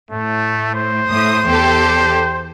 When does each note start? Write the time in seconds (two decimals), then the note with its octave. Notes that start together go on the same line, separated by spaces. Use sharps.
0.11 A2 A3
0.75 C5
1.09 A2 D#6
1.46 E2 G4 A4